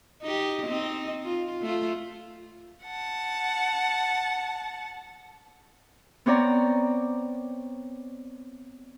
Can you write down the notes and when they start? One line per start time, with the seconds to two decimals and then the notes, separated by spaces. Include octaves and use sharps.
0.22 D#4 G4
0.67 C4 D#4
1.23 F4
1.62 A3 F4
2.84 F#5 A5
6.26 B3 C4 C#5 D5 A#5